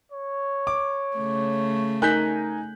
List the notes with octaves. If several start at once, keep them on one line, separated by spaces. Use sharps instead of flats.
C#5
D6
C#3 A3
D#4 A#4 G#5 F#6 G6 B6